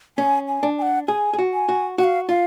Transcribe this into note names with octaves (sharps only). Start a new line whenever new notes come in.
C#4 G#5
G#5
D4
G#5
F#5
G#4 G#5
G#4
F#4
G#5
F#4
F#4 F#5
F5
F4 F5